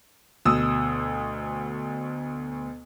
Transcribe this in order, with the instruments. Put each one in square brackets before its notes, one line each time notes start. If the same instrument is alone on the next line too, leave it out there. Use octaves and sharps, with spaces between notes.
[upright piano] D2 B2 D#6 E6